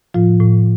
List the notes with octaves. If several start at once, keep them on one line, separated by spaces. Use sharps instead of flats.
A2 F3 F4
A2